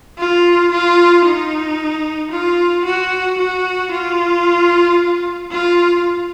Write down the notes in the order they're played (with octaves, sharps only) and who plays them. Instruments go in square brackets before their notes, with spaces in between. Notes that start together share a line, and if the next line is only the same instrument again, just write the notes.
[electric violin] F4
F4
D#4
F4
F#4
F#4
F4
F4